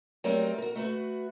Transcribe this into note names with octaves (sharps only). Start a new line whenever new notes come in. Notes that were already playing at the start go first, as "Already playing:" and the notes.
F#3 G3 A3 C4 A#4
F#4 A#4
A3 F#4 B4